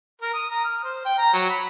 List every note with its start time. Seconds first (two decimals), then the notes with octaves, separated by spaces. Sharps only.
0.22 A#4
0.34 D#6
0.50 A#5
0.64 F6
0.84 C5
1.05 G5
1.18 A#5
1.33 F#3
1.49 B5